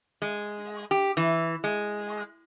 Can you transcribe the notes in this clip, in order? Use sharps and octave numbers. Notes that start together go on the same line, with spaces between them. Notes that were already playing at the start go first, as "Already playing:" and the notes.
G#3
G4
E3
G#3